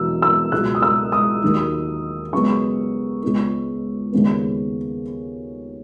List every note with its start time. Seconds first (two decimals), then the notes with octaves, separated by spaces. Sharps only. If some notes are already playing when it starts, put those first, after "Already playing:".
Already playing: E2 B2 F#3 B3 E6
0.22 E6
0.52 C#2 B2 F#3 F#6
0.75 D#6
0.82 E6
1.12 D#6
1.42 D#2 D#3 F#3
2.33 F#2 C#3 G#3 B3 C#6
3.23 C#2 C#3 G#3 B3
4.12 D#2 C#3 G#3 B3